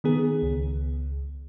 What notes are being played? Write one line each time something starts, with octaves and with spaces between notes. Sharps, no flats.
D#3 B3 G#4
C#2